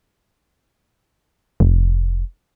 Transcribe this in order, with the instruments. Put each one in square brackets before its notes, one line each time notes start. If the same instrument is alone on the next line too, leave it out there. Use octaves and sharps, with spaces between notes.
[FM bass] F1